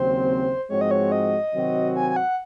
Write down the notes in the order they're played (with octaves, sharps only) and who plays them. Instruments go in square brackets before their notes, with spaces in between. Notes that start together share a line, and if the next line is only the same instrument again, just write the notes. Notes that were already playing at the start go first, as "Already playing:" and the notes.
Already playing: [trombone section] D#2 C#3 F#3 C4 [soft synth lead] C5
[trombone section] G#2 F3 G#3 C4 F#4 [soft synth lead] C#5
[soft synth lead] D#5
C#5
D#5
[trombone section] C3 D#3 F#3 C4 F#4
[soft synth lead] G#5
G#5
F#5